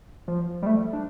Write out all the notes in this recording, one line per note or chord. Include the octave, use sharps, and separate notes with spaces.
F3
G3
A3
D4